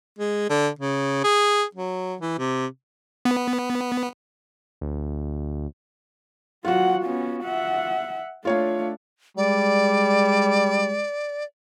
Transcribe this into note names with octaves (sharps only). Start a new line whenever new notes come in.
G#3
D3
C#3
G#4
F#3
E3
C3
B3
D2
F#3 F4 F#4 F#5
B3 C#4
E5 F#5
A3 D4 F4 C#5 F5
G3 G#3 D5